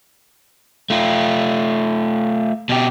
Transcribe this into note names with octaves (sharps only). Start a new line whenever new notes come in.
A3 F4
B2 G4